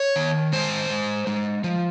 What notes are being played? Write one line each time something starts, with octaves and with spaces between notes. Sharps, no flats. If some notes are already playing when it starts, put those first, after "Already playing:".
Already playing: C#5
D#3
G#3 C5
G#3
G#3
F3